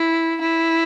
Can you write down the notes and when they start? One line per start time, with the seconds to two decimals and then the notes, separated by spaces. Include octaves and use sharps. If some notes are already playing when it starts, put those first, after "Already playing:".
Already playing: E4
0.41 E4